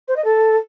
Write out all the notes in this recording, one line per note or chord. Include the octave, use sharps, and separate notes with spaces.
C5
D#5
A4